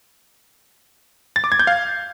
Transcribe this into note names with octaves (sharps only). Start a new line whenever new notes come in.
A6
D6
G#6
G6
F5